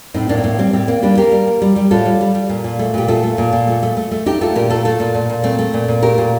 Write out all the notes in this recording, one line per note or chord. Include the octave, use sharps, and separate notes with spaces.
A2 C4 D#4
A2 A#3 D4
C4
A2 A#3
G3 C4
A2 C4
A#3 C4
G3 A#3 D4
A#3 G4 A#4
G3
A#3
G3
G3
A2 F4 A4
G3
G3
G3
A#2
A#2
A3
A#2 G4
A3 F4 A4
A3
A#2
A#2
A3
A3
A3
A3
A3 D#4 G4
A3 F4 A4
A#2 G4 A#4
A3 F4 A4
A3 F4 A4
A#2
A#2
A#2
A3 C4
A3
A#2
A#2
A3 G4 A#4
A#2